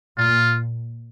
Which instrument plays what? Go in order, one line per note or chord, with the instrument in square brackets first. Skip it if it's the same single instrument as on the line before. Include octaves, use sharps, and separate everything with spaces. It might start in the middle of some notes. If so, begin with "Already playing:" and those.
[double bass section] A#2 [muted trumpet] F4